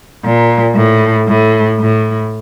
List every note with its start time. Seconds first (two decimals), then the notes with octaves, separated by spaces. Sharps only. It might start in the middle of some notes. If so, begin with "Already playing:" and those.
0.25 A#2
0.76 A2
1.28 A2
1.80 A2